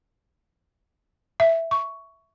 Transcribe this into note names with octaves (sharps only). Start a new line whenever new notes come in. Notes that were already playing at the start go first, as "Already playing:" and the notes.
E5
C#6